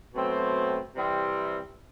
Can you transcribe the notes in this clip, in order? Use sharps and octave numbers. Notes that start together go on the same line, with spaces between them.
B2 F#3 A3 C4
C3 E3 G3 C4